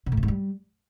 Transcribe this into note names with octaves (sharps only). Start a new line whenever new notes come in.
C3
A2
C#3
G#2
G3